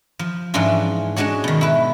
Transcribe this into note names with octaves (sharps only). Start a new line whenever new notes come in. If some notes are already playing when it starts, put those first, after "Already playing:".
F3
G#2 E3 F3 C#4 D4 F4
G#3 C#4 D4 F#4 C#5
B2 D#3
E4 B4